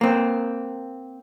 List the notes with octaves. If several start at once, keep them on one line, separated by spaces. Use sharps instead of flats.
A#3 C4